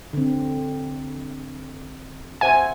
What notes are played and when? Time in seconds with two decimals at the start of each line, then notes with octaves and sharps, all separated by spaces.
0.13 D3 C4
2.41 C5 E5 F#5 G#5